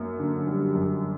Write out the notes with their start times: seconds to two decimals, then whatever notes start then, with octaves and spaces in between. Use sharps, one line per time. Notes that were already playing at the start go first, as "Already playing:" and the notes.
Already playing: F#2 A#3
0.19 D3
0.47 G3
0.75 F#2